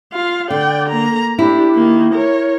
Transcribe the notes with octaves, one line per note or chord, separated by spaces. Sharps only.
F4 F5
D3 D5 G5
A#3 A#5
D4 E4 G4
D#3 A#3
A#4 C#5